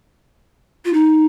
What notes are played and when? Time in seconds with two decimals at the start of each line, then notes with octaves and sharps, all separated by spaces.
0.85 F4
0.93 D#4